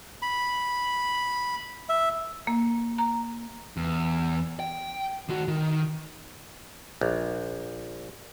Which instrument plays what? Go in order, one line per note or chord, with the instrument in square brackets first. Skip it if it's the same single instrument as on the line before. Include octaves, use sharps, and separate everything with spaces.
[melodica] B5
E5
[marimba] A#3
A#5
[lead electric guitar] E2
G5
D#3 F#4
D#3
[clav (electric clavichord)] A#1